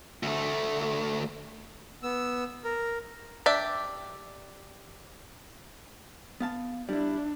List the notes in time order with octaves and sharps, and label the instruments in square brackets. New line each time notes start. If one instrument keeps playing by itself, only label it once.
[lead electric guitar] D2 A3
[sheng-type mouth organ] B3 E6
A#4
[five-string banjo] D4 G4 D5 E5 G5
[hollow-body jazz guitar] B3 F5 A5
[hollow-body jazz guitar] G3 E4 [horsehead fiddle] D4